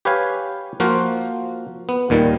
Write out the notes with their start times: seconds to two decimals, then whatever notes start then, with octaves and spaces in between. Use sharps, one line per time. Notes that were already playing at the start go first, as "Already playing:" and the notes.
0.05 G4 B4 C#5 F5 G#5
0.80 F3 A#3 F4 F#4 C5
1.89 B3
2.10 D#2 A#2 D#3 G3